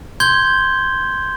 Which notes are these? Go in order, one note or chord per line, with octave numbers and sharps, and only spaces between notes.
C6 G6 G#6 G7